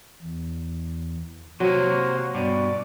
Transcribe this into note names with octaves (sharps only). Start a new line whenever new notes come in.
E2
C3 F#3 A#3 C5 C#5 F#5
G2 B2 D5